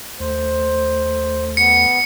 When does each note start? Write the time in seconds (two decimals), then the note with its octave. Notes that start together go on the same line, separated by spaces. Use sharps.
0.20 D#2 A3 C5
1.57 B3 C#7